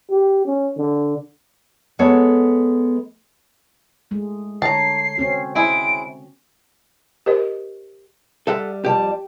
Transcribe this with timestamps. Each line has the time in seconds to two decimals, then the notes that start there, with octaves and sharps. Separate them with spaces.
0.10 G4
0.45 C#4
0.77 D3
1.99 G#3 B3 A4 C#5
4.11 G#3 A3
4.62 D3 C#5 A5 A#5 C7
5.18 C4 C#4 F#4
5.55 G#3 C4 E4 D7
7.26 G4 A#4 C5 D#5
8.47 G3 A4 E5 F#5
8.85 F2 G3 G4 A5